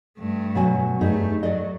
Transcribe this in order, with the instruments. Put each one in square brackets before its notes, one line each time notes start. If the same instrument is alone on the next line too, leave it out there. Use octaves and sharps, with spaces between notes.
[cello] G2 A3
[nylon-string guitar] B2 F#3 G#5
[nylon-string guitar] G2 D#4 G#4 [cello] A3
[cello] F#3 [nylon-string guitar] D5 D#5